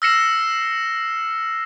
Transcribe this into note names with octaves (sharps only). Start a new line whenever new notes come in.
E6 F6 A#6 C7 C#7 E7